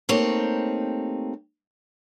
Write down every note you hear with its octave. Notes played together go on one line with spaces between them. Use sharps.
A3 A#3 C4 D#4 G4 C#5